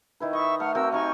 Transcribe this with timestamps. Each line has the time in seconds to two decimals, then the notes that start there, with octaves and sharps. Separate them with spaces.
0.20 D#3 E4 B4
0.33 D#5 E5 C#6
0.60 A3 F#5 F6
0.75 A3 C4 F#4 A#4 E6
0.92 A3 D#4 G4 G#5 C#6 F6